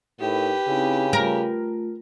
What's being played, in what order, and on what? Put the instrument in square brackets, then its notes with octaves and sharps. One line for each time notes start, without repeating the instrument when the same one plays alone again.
[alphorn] A2 [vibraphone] D#4 A#4 [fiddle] G4 B4
[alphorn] C#3 [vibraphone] C4 D#4 E4
[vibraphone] A3 F4 [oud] A#4